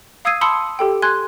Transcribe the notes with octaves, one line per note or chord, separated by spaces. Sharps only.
F5 D#6 E6 G#6 C7 D#7
A5 B5 C6 D#6 E6 C#7
G4 A4 G5
G#5 C6 F#6 G#6